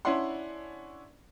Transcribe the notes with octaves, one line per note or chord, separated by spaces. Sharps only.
C#4 D4 E4 D5 F#5 C6